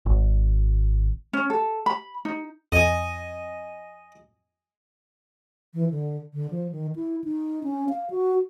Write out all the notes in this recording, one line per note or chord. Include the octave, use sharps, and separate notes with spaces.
G#1
C#4
A4
B5
D#4
F2 D#5 G#5
E3
D3
D3
F3
D#3
E4
D#4
C#4
F5
F#4